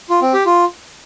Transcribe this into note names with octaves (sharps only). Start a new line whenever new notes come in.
F4
C4
G4
F4